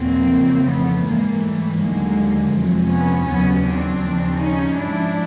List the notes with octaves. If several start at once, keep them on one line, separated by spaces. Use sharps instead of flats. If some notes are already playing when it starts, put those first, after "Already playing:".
Already playing: E2 B2 F#3 A#3 C4
F2 C#3 E3
A3 B3
G#2 E3 G#3 A#3
G3 A3
D#2 D3 F#3 G#3 A#3
F2 C3 F3 F#3 G#3
B3 C#4
D#2 C#3 F#3 B3 C#4
C4 D4
D#2 C#3 F3
C#4 D#4
G#2 F3 D4 E4